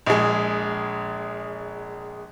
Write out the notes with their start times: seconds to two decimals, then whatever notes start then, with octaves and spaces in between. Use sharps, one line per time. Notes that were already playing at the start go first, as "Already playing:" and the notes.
0.06 A#1 G#3